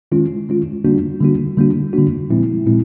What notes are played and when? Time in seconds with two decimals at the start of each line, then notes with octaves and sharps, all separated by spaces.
0.12 D#3 G#3 C#4 F4
0.49 D#3 G#3 C#4 F4
0.84 D3 G3 A#3 D4 F#4
1.21 D3 G3 A#3 D4 F#4
1.57 D3 G3 A#3 D4 F#4
1.93 D3 G3 A#3 D4 F#4
2.30 A#2 F3 G#3 C4 E4
2.66 A#2 F3 G#3 C4 E4